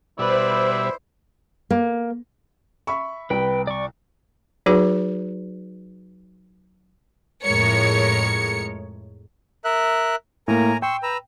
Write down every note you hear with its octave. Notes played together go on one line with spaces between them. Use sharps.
B2 G3 E4 B4 C5 D5 E5
A#3
E5 B5 C#6
C2 B4 G5
D5 C#6
F#3 D#4 F#4 G#4 B4
F2 A2 G#3 A#4 C#5 C#7
A#4 E5 F#6
A2 A#3 A#4 G#5 A#5
G5 C6 C#6 E6
B4 A#5 E6